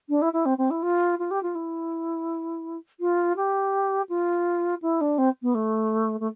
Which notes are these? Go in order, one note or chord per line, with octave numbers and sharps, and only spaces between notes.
D4
E4
E4
C4
C4
E4
F4
F4
G4
F4
E4
F4
G4
F4
E4
D4
C4
B3
A3
A3